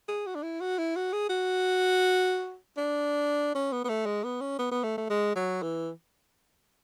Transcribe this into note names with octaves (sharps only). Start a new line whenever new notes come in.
G#4
F#4
D4
E4
F#4
E4
F#4
G#4
F#4
D4
C#4
B3
B3
A3
G#3
B3
C#4
B3
B3
A3
A3
G#3
F#3
E3